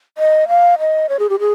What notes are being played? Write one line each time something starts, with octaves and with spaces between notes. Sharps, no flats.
D#5
F5
D#5
C#5
G#4
G4
G#4